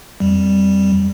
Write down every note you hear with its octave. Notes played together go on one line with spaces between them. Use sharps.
F2 G3